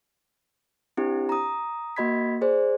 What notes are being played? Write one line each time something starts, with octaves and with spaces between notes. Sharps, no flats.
C4 D4 E4 G4
A#5 D#6
A#3 F#4 D#5 B5 G#6 B6
G#4 C5 D5